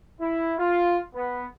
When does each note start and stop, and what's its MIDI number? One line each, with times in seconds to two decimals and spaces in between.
0.21 0.53 64
0.59 0.98 65
1.15 1.45 59